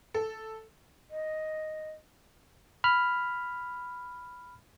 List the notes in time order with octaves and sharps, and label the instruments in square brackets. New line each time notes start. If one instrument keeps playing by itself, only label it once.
[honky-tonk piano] A4
[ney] D#5
[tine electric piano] B5 F6